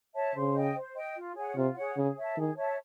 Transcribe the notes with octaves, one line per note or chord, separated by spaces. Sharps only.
C#5 E5 A5
C#3 C5
D#5 G5
C5
D#5 G5
F4
G#4 C#5 F#5
C3 F4
G#4 C#5 F#5
C#3 G#4
C#5 E5 A5
D#3 G#4
C#5 E5 A5